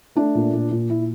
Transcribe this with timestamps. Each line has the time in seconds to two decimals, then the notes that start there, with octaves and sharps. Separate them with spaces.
0.16 A3 D4
0.35 A#2
0.53 A#2
0.71 A#2
0.90 A#2 E4